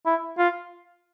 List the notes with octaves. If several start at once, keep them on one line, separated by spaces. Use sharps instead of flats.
E4
F4